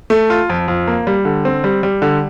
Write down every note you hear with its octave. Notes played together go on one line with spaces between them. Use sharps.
A3
F4
F2
F2
A#3
G3
D3
C4
G3
G3
D3